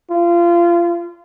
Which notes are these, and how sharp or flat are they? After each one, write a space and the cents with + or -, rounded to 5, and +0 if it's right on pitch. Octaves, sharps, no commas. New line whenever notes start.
F4 -25